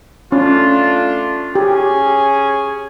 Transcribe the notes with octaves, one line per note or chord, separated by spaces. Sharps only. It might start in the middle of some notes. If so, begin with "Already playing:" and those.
A3 C#4 D4 F4
C#4 G4 G#4 G#5